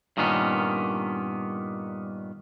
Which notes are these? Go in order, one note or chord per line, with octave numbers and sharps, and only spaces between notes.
G2 A#2 D#3 B3 C#4